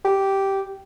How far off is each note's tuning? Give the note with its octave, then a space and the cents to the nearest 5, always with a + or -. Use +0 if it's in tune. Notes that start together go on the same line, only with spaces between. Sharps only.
G4 -10